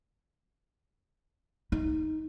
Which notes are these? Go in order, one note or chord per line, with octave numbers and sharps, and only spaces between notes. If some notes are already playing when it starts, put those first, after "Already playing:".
D#4